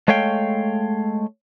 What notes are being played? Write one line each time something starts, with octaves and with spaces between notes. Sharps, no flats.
G#3 A3 C#5 F5 G5